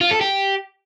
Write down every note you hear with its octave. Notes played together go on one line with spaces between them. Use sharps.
F4
A4
G4